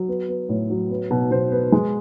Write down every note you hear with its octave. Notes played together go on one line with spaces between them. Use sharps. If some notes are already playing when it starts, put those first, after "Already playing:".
Already playing: F#3
B3
B3
A2
F#3
B3
B2
B2 C5
B3
G#3